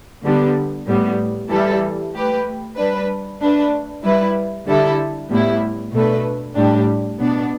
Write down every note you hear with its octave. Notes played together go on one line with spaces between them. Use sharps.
D3 G3 B3 D4
A2 G3 B3
E3 G3 E4 A4
A3 G4 B4
G3 D4 B4
A3 D4 B4
G3 E4 B4
D3 G3 E4 A4
A2 G3 B3 E4
B2 A3 D4 B4
A2 G3 D4 G4
B2 B3 D4